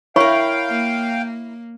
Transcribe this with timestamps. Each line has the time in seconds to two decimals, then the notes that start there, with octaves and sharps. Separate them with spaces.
0.16 E4 A#4 C#5 F5 G5 B5 C#6
0.69 A#3